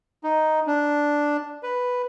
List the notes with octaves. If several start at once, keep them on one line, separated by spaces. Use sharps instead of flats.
D#4
D4
B4